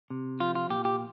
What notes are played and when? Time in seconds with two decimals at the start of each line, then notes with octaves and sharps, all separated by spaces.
0.10 C3
0.40 F3 F4
0.55 F4
0.70 A#2 G4
0.85 G4